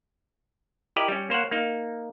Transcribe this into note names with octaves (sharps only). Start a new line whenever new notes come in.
E4 G4 A#4 D5 D#5
G3 C#4
A#3 C5 C#5 F#5
A#3 D#4